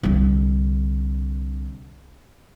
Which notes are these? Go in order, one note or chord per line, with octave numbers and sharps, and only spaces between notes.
C2 D3